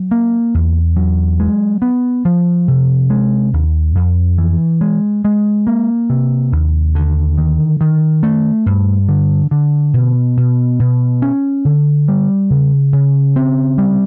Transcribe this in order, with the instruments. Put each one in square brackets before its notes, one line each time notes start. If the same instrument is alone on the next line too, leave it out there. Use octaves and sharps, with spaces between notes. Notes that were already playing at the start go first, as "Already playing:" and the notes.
Already playing: [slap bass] F#3
A#3
E2
F#3
G#3
B3
F3
C3
G#3
D#2
F2
E3
G#3
G#3
A#3
C3
D#2
D3
D#3
D#3
A3
G2
D3
D3
B2
B2
B2
C#4
D3
G3
C#3
C#3
C4
G3